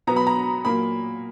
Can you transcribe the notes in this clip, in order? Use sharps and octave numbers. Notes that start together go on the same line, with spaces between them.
B2 F#3 B3 A#5
B5
A#5
A#2 F#3 A#3 B5